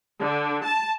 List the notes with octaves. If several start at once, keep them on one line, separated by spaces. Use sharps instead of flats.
D3
A5